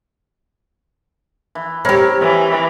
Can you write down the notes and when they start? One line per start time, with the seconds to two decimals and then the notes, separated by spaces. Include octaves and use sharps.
1.55 E3
1.85 C4 E4 G4 A#4 C#5
2.22 E3